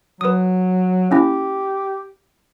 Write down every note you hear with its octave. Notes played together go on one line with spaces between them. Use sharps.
F#3 B4 D#6
A#3 C#4 E4 G4